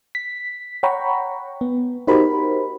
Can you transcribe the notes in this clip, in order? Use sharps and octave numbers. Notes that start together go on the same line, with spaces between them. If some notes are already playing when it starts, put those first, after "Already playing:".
B6
C#5 F#5 G5 A#5 B5 C#6
B3
D#4 F#4 G4 A#4 C5 B5